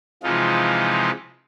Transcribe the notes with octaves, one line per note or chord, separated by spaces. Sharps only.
C3 E3 F3 G#3 D#4 F4